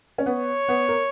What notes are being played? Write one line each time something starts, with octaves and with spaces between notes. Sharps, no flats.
C#4
B3 C#5
B3
A#4